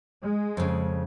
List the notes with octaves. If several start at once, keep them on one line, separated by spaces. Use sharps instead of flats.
G#3
F2 C#3